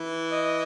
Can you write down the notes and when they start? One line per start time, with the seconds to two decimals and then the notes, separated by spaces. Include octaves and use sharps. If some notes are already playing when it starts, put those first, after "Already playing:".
Already playing: E3 E4
0.32 D#5